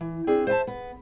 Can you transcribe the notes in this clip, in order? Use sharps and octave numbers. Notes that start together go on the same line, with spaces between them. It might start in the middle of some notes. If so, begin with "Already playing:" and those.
E3
C4 D4 G#4
C5 E5 G#5 A5
B3